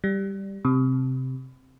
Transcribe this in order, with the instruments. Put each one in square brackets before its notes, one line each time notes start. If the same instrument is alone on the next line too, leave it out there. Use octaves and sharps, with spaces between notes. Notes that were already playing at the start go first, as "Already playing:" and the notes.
[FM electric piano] G3
C3